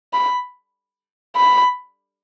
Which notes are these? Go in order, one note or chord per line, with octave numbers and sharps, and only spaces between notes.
B5
B5